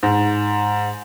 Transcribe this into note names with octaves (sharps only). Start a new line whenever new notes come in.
G#2